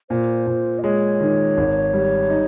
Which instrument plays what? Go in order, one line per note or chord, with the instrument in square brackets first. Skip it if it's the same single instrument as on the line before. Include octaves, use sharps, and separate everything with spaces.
[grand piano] A#2 [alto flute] C5
[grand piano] A#2
[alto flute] D#5
[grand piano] G#3 [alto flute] C#5
[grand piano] D#3
G#1
G3
D#4